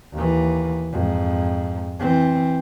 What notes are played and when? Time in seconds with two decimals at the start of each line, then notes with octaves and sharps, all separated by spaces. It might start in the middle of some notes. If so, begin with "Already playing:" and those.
0.14 D#2 E3
0.92 F2 G#2
2.00 E3 C4